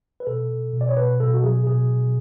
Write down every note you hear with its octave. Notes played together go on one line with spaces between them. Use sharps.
B4
B2 A4
B2
B2
D5
C#5
B2 B4
B2 A4
F#4
F#3 G#4
B2 G#4
B2